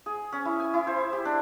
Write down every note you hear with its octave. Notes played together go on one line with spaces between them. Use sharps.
G#4
C#4
E4
G#5
E4
C5
G4
D4